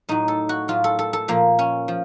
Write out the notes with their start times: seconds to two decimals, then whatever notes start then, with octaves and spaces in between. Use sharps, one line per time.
0.09 A2 F#3 D#4
0.28 A4
0.49 F#4
0.68 A2 F#3 F4
0.84 A4
0.99 A4
1.13 A4
1.28 A#2 F3 A#3
1.59 C#4
1.88 F3